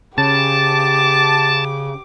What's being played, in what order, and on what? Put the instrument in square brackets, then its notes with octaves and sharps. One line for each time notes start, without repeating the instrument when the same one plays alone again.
[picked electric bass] C#3 [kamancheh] G4 D6 [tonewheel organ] A5